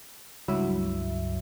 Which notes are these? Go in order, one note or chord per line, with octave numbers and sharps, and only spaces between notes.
C#2 G2 F#3 E4 E5